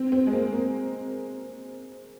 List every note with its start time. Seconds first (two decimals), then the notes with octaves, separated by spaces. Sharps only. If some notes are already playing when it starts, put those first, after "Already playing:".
Already playing: C4
0.12 C4
0.27 G#3
0.33 A#3
0.53 A#3